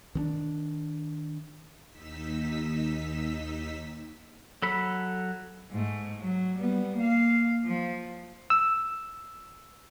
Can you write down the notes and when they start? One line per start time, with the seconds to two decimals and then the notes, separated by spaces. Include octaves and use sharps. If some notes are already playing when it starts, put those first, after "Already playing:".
0.15 D#3 C4 D4
1.89 D#2 D#4 E6 B6
4.62 F#3 A4 B5
5.71 G#2 A3
6.21 F#3
6.57 G3 B3
6.96 A#3 F5
7.65 F3
8.50 E6